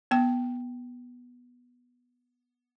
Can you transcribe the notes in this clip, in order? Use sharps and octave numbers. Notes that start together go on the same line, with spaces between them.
B3 G5